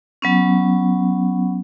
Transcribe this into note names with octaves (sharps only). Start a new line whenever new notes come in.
F#3 B3 C#4